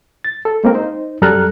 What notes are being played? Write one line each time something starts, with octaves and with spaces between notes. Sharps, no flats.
A6
A4
G#3 A#3 C4 A#4
D#4 C5
F#2 G3 A4 A#5 F6 F#6